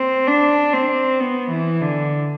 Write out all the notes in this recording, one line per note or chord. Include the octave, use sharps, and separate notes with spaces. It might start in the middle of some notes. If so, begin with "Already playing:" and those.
Already playing: C4
D4
C4
B3
E3
D3